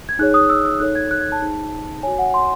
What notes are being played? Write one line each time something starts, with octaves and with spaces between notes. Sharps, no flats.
G#6
D#4 G#4 C#5 F#6
D#6
E6
E6
D#4 A4 C#5 F#6
G#6
F#6
G#6
A5
D#4 G#4 C5
F#4 C#5 G#5
F#5
C6